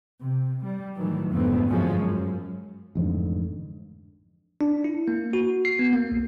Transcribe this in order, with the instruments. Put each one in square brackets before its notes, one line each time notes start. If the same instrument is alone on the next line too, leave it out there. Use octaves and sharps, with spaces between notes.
[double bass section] C3
G3
A2 D#3 E3 F#3
F2 G#2 D3 A3 B3 C4
G1 F#2 F3 G#3 C#4
F#2
[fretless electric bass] A1 F2 G#2 D3
[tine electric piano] D4
E4
A#3
F#4
C7
B3
A#3
B1